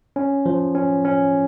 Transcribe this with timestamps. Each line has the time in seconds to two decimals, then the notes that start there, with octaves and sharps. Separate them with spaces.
0.16 C#4
0.46 F3
0.75 C#4
1.05 C#4